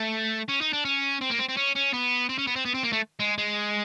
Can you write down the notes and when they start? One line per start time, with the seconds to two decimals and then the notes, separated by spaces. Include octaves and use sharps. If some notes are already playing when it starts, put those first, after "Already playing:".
Already playing: A3
0.48 C#4
0.61 D#4
0.73 D4
0.85 C#4
1.21 C4
1.30 A#3
1.39 C4
1.49 C4
1.57 C#4
1.75 C#4
1.93 B3
2.29 C4
2.38 C#4
2.47 B3
2.56 C4
2.65 B3
2.74 C4
2.83 A#3
2.93 A3
3.20 G#3
3.38 G#3